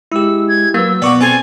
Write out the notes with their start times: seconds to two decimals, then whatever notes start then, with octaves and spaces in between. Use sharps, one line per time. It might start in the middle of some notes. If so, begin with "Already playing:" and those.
0.12 G#3 E4 G4 E6
0.48 G#6
0.74 F#3 A#3 B4 E6
1.02 B2 B3 F#4 D5 C#6 D6
1.21 C4 F4 A4 G#5